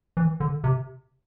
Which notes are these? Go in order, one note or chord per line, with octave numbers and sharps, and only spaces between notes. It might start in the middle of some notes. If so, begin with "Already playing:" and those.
E3
D3
C3